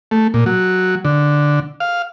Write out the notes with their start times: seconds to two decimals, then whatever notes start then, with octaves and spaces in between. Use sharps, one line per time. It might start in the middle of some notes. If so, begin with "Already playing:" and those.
0.11 A3
0.34 A#2
0.46 F#3
1.05 D3
1.80 F5